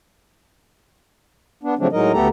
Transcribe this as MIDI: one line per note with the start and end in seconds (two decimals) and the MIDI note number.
1.63 1.74 59
1.63 1.74 62
1.79 1.87 49
1.79 1.87 53
1.79 1.87 54
1.79 1.87 57
1.79 1.87 60
1.79 1.87 62
1.93 2.12 45
1.93 2.12 54
1.93 2.12 56
1.93 2.12 63
1.93 2.12 70
1.93 2.12 75
2.13 2.28 38
2.13 2.28 57
2.13 2.28 59
2.13 2.28 67
2.13 2.28 69
2.13 2.28 82